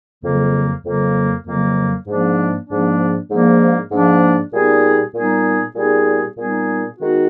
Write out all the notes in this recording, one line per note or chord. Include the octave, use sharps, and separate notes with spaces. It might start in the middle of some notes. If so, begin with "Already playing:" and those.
F2 C#3 F#3 A#3
F2 C#3 F#3 A#3
F2 C#3 F#3 A#3
G#2 F3 A#3 D4
G#2 F3 A#3 D4
G#2 F3 A#3 D4
G#2 F3 A#3 D4
A#2 G3 B3 D#4 G#4
A#2 G3 B3 D#4 G#4
A#2 G3 B3 D#4 G#4
A#2 G3 B3 D#4 G#4
D#3 G#3 B3 D#4 F#4